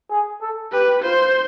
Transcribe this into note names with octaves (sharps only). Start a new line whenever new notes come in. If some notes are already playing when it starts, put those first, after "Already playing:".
G#4
A4
G4 B4
F4 C5